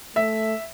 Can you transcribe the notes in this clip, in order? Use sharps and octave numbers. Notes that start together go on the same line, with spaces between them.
A3 E5